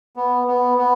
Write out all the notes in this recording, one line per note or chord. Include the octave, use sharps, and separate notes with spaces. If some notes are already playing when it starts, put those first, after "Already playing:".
B3
B3
B3